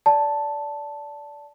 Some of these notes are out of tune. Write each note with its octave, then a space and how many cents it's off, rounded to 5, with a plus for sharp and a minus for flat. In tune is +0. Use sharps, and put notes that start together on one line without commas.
D5 -20 A5 +0